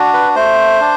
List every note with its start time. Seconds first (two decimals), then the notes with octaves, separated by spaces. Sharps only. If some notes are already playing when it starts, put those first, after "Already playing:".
Already playing: D4 F#4
0.13 B4
0.36 A3 C5
0.81 D4